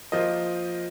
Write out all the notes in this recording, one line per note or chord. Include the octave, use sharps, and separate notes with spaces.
F3 A#3 F4 C5 D#5